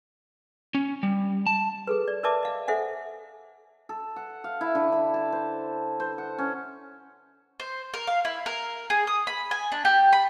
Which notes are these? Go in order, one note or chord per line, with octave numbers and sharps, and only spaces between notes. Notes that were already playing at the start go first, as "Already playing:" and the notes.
C#4
G3
A5
G#4 A4 B4
D5
A#4 B4 D5 E5 A5 D6
D#5 F5
A4 C5 E5 F#5 G#5
A4
F#5
F5
E4
D3
B5
A5
C5
C5
F#5
C#4
C5
A#4
F5
E4
A#4
G#4
D#6
B5
G#5
D4
G4
B5